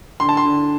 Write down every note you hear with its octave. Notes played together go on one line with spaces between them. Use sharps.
D3 C6
A5
C6
D3